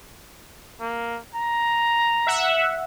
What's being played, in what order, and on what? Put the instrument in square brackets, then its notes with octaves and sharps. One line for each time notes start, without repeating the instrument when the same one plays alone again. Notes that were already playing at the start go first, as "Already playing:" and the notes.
[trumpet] A#3
A#5
[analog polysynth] E5 F#5